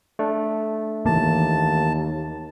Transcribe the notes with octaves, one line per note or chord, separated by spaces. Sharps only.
A3 D4
D#2 E3 A#3 A5